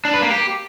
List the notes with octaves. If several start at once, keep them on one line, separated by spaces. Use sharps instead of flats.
D4
B4
A#3
G4